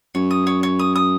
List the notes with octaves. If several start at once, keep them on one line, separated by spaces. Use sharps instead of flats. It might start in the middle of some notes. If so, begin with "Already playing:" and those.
F#2 C#5
D#6
C#5
C#5
D#6
D#6